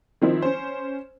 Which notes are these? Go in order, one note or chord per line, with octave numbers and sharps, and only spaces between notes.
D#3 F3 C4 D#4 E4
C#4 C5